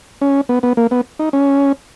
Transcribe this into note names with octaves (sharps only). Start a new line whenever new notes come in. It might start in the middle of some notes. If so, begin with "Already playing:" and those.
C#4
B3
B3
A#3
B3
D#4
C#4